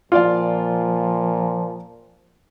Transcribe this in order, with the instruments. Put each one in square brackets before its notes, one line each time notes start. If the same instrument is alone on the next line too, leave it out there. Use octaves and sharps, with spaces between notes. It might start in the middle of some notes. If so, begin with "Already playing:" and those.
[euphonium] A#2 [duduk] F3 [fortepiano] F4 D5 F5